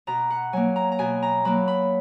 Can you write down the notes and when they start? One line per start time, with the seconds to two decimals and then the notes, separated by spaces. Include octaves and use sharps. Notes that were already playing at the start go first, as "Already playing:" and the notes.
0.07 B2 A#5
0.30 F#5
0.53 F#3 A#3 G#5
0.76 A#5
0.92 A#5
0.99 B2 G#5
1.23 A#5
1.45 F#3 A#3 B5
1.68 B5